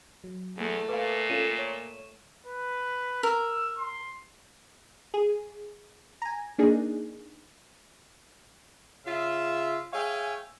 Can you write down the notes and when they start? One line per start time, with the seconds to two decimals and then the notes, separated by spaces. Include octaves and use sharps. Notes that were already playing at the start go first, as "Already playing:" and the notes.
0.24 F#3
0.57 E2 A3
0.89 A#2 B4 F5 D6
1.30 C#4 F4 A4 D#7 E7
1.59 C#5
2.47 B4
3.23 A#4 E6
3.77 C6
5.14 G#4
6.22 G#5 A#5
6.58 A#3 D4 D#4 G#4
9.06 C#3 F4 E5
9.93 G#4 C#5 E5 F5 G5 G#5